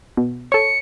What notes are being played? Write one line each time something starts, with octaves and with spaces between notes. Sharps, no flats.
B2
A4 C#5 C#7